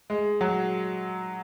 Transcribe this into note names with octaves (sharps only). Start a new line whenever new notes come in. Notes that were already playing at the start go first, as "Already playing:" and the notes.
G#3
F#3